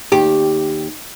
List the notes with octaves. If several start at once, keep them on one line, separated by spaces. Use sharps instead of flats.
D#2 G4